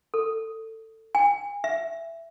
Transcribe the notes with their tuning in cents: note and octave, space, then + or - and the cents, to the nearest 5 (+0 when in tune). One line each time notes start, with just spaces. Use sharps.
A4 +20
G#5 -35
E5 +15